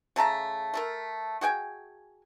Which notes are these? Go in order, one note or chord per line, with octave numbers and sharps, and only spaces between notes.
C#3 A3 A5 A#5
A3 A4 A#4
F#4 G#4 G5 G#5